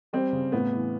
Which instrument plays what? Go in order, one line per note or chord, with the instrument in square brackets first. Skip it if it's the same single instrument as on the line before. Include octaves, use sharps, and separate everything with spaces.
[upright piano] G3 C4
C#3
A2 B3
E3